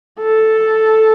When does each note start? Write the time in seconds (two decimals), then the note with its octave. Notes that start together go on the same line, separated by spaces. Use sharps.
0.20 A4